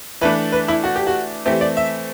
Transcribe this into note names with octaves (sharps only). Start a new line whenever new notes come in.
E3 A3 D4 B4
B4
E4
F#4
G4
F#4
E3 A3 C4 G4
D5
E5